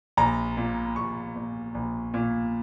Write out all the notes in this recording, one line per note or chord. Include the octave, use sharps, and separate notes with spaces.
A#1 A#5
A#2
A#1 C#6
A#2
A#1
A#2